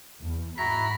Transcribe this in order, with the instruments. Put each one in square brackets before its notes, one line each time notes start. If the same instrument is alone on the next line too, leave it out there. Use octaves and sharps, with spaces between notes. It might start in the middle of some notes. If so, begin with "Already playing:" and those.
[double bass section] E2
[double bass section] G#2 [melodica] E4 F#4 A#5 [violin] B5 [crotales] A#6 B6